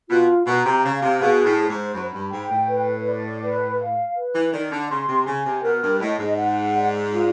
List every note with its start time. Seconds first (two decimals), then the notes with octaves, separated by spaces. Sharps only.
0.09 B2 F4
0.46 B2 A#5
0.65 C3
0.83 C#3 F5
1.02 C3
1.20 B2 G#4
1.45 A2
1.57 C5
1.70 G#2
1.94 F#2 B5
2.13 G2
2.31 G#2 G5
2.50 A2
2.68 B4
3.06 D5
3.42 B4
3.79 F5
4.16 B4
4.34 E3
4.53 D#3 D5
4.71 D3
4.89 C#3 C6
5.07 C3
5.26 C#3 G#5
5.45 C3
5.63 B2 A#4
5.82 G2
6.00 A2 D#5
6.19 G#2
6.37 F#5
6.74 D5
7.11 F4